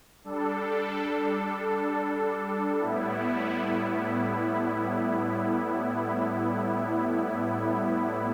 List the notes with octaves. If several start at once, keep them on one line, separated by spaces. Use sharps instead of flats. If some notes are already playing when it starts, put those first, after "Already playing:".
G3 D4 A4
A2 G3 B3 E4